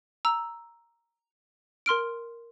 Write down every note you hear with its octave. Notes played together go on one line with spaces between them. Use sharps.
A#5 E6
A#4 C6 F6 D7